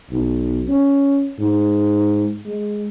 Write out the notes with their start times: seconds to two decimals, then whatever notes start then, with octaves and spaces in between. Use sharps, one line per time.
0.10 B1
0.67 C#4
1.39 G#2
2.45 G#3